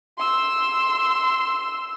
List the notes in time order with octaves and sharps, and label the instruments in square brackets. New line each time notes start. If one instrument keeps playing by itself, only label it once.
[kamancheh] C6 E6